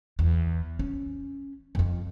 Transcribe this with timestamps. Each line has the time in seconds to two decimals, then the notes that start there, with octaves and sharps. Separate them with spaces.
0.19 E2
0.79 C#4
1.75 F2 F4